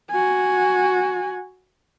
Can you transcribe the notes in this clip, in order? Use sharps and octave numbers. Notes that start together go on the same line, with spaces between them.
F#4 G#5